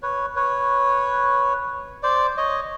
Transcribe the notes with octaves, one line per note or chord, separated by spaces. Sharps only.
B4 C#5
B4 C#5
C5 D5
C#5 D#5